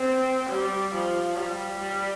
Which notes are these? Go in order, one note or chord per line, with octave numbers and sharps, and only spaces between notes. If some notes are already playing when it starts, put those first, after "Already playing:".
Already playing: C4
G3
F3
G3
G3